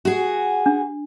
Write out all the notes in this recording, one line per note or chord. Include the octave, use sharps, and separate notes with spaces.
F#4 G#4
D4